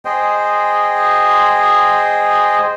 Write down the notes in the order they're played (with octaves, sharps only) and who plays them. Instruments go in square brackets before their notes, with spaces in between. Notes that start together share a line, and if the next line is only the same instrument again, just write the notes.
[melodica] G#4 C5 D#5 G5